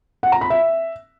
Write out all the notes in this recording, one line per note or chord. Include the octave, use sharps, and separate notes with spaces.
F#5
A#5
B5
E5